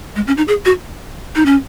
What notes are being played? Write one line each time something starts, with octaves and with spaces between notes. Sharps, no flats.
G#3
C#4
D#4
G#4
F#4
D#4
C#4